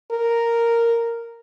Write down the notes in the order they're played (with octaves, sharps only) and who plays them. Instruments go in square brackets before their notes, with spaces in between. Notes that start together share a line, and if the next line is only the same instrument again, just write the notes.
[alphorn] A#4